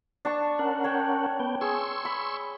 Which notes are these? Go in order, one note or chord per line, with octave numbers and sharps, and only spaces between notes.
D4 A5 C#6
C#4 A#4 F#5
C#5 G5 A5
B3 G5
G#4 C6 C#6 E6
B5